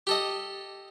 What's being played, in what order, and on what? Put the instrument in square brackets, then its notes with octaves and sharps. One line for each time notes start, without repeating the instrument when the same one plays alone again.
[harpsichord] G4 A4 D#5